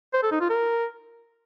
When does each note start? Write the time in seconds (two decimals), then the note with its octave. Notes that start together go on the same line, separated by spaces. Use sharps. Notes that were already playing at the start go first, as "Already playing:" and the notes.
0.14 C5
0.23 A4
0.32 D#4
0.40 F4
0.49 A#4